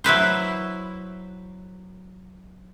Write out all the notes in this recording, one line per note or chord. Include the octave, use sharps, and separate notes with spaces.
F#3 E4 B4 C5